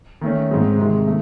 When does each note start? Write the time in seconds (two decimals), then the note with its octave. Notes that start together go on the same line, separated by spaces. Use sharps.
0.21 D#3 A3 C#4
0.50 G#2 D#3 G#3 C4
0.78 C3 D#3 G#3
1.07 A3